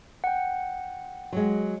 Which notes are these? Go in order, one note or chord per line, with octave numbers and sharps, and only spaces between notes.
F#5 G5
F#3 G#3